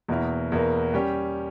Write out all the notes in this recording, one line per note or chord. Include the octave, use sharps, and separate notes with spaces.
E2 B2 A#3 E4 A#4
E2 B2 A#3 E4 A#4
G3 C#4 G4